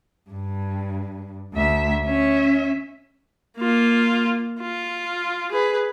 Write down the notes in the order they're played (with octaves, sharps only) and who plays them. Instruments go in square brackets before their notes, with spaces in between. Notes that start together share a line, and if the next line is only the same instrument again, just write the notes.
[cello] G2
D2 E5
C#4 E5
[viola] A#3 F4
F4
G#4 B4